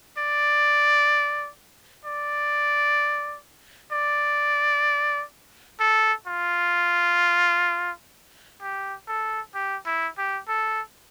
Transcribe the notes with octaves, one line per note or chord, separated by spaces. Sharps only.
D5
D5
D5
A4
F4
G4
A4
G4
E4
G4
A4